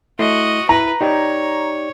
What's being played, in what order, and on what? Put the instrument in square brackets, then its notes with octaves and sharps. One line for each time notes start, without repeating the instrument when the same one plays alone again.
[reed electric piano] A3 E4 C6 [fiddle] F#4 D#5
[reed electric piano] E4 [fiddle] B4 [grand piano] A#5
[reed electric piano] D#4 G4 D5 [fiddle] C#5